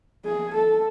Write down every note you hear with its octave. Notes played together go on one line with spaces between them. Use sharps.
G#4
A4